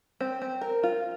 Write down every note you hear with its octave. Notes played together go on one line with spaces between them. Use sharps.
C4
C4
A#4
F4